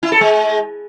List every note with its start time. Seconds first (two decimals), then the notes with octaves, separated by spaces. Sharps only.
0.03 E4
0.12 A4
0.21 G#3